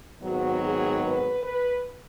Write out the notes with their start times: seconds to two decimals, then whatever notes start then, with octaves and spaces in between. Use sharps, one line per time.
0.22 G#1 G#2 D#3 F#3 B3 F#4
0.63 G#4
1.02 B4
1.42 B4